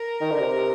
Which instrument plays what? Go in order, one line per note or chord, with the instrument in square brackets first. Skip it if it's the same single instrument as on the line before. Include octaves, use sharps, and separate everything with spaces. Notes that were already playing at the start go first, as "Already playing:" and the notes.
Already playing: [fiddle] A#4
[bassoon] D#3
D3
C3